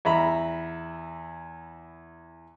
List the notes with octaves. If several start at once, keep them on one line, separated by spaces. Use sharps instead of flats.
E2 E5 A#5 B5